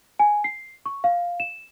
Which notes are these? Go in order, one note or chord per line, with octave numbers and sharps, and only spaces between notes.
G#5
C7
C#6
F5
E7